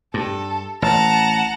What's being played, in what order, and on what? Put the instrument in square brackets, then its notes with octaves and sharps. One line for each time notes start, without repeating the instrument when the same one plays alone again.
[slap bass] G2 [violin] A4
[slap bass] A1 [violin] F#5 A#5 [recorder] A5